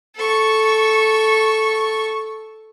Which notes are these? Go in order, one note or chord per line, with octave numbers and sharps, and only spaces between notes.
A4 C#6